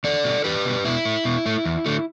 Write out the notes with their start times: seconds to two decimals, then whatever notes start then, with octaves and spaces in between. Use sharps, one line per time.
0.04 E2 A4 D5
0.24 B2 G3
0.44 E2 G4 B4
0.65 B2 G3
0.85 B2 E4
1.05 A3
1.25 B2
1.46 A3
1.65 E2
1.86 D3 A3